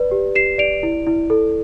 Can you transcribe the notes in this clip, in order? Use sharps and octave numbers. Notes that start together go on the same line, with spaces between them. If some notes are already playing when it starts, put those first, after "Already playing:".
Already playing: B4 D5
G4
G4 C7 E7
D5 D7 F7
E4
E4
A4